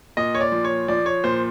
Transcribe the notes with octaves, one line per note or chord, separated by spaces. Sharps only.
A#2 D#5
C#5
D5
F3
C#5
F3 D5
C#5
A#2 C5